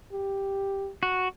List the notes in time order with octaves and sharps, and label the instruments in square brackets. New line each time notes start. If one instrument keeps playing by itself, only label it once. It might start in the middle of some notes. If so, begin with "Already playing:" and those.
[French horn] G4
[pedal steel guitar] F#4